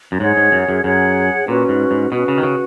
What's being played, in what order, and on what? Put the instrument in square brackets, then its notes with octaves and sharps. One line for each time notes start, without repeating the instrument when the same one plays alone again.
[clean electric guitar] F#2
[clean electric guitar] G#2 [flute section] G#4 C#5 F#5
[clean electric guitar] G#2
F#2
F#2
[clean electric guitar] F#2 [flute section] G#4 C#5 F#5
[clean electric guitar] A#2 [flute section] C#4 F#4 B4
[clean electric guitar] G#2
G#2
[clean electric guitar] B2 [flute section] C#4 F#4 B4
[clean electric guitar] C#3
D#3
C#3